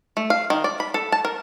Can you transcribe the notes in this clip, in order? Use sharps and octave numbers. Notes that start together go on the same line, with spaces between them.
A3
F5
D#3
D5
B5
A4
A5
A#4